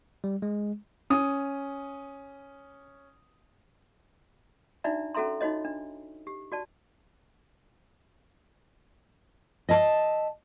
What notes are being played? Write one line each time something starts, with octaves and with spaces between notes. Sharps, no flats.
G3
G#3
C#4 D#6
D4 D#4 F#4 D5 E5 A#5
C#4 F#4 A4 E5 A#5 C6
D#4 F4 F#4 C#5 D#5
D4
G4
F#4 D5 A5
D#5 E5 A5